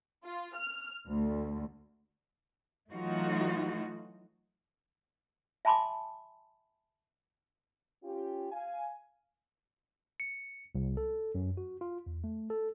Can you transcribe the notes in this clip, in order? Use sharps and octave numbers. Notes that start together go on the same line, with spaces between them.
F4
F6
D2
E3 F#3 A3 D#4 F4 F#4
E5 G#5 A5 B5 C6 D6
C#4 F4 G4
F5 G#5
C#7
C2
A4
F#2
F#4
F4
E2
A3
A4